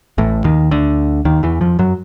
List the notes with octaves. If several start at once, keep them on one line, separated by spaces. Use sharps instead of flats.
A1 A2
D#2 D#3
D2 D3
D#2 D#3
E2 E3
F2 F3
F#2 F#3